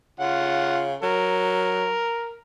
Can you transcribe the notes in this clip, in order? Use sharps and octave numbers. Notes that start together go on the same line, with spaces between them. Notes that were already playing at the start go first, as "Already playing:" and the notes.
C#3 F4 F#5
F#3 A#4